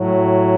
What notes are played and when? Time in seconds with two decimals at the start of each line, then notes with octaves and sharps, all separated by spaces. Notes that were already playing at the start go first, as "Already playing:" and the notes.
Already playing: A2 F#3